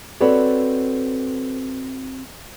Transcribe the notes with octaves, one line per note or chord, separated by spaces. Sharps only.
C4 F#4 A4 B4 C#5 D5